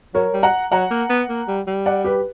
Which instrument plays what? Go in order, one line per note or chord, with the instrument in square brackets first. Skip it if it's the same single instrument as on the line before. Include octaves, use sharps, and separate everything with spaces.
[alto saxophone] F#3 [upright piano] A#4 C#5
[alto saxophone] G3
[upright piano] F#5 A#5
[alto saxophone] F#3 [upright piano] F#5 A#5
[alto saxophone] A#3
B3
A#3
G3
G3
[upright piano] D5 F#5
G4 B4